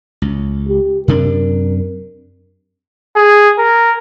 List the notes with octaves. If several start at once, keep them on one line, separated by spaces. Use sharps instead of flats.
C#2
G4
F#2 C3 D4 A#4
G#4
A#4